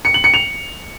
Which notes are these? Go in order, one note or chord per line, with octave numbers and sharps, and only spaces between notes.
C#7
F#7
C#7
F7